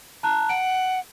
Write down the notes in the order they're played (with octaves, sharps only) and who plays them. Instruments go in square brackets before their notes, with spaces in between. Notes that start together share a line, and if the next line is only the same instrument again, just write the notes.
[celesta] A5 A#5 F#6
[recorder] F#5 [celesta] D7